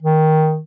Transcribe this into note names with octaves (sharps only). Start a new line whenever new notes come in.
D#3